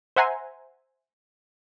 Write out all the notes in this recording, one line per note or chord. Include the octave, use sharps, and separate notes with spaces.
C5 E5 F#5 G#5 A#5 C6